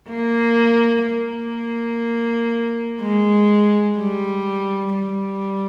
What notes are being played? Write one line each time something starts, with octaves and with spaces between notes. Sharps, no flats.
A#3
A#3
G#3
G3
G3